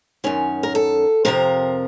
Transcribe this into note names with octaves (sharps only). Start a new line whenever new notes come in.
F#2 D#3 C#4
A#4
A4
F2 C3 F3 A#4